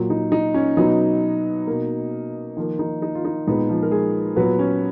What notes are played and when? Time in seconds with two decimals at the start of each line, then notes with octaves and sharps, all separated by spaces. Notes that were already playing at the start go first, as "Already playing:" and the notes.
Already playing: A#2 F#3 A#3
0.10 D#4
0.32 D#4
0.54 C#4
0.77 B2 F#3 B3 D#4
1.67 B2 A#3
2.57 D#3 F3 A#3 F4
2.79 D#4
3.02 D#4
3.15 F4
3.25 D#4
3.47 A#2 G#3 B3 D#4
3.69 F3 F4
3.83 A#4
3.91 G#3 G#4
4.36 A#2 F#3 B3 B4
4.59 C#4